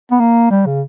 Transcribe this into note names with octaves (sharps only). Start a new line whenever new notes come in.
B3
A#3
G3
C#3